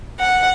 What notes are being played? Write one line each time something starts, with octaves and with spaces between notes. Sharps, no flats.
F#5